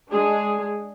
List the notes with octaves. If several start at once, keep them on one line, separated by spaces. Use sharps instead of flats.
G#3 D4 G#4